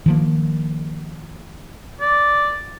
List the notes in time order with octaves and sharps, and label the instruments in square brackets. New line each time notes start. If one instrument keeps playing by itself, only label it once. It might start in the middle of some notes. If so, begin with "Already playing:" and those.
[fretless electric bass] D#3 F3 A#3
[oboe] D5